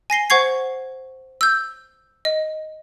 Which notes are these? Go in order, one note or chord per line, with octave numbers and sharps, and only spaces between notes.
G#5 A#6 C7 G7
C5 F#5 C#6 G#6 C7
E6 G6
D#5